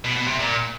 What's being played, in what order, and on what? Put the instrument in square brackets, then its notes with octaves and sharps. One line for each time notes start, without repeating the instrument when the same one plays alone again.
[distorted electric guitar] B2
B2
C3
A#2